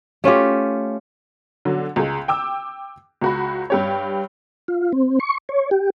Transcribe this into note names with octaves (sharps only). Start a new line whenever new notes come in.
A3 C#4 F4 G4
D3 F#3
C#2 G#3
G5 D6 E6
C#2 F#4 B5
G2 G4 C#5
F4
C4
C#6
C#5
G4